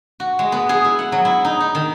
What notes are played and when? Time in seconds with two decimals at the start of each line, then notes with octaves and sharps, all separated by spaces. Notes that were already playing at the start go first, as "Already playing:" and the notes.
0.20 F#4
0.39 G#3
0.52 B3
0.69 G#4
0.85 E4
0.99 F#5
1.12 F#3
1.25 E4
1.45 D#4
1.60 D#4
1.75 D#3